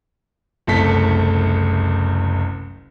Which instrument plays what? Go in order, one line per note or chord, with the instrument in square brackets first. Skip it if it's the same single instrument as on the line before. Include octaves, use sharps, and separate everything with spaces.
[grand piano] F#1 C2 A3 A4 B6